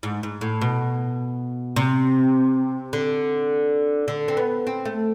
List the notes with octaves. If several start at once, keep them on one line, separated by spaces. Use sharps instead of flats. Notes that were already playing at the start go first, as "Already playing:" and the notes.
G#2
G#2
A2
B2
C3
D3
D3
C4
B3
C4
A3